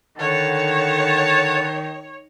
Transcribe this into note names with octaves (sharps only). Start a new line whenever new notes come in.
D3 D#3 C#5 F#5 A5